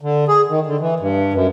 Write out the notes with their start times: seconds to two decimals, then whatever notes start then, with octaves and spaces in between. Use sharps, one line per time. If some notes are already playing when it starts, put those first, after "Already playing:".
0.01 D3
0.28 G#4
0.49 D#3
0.67 D3
0.80 E3
1.00 G2
1.34 F#2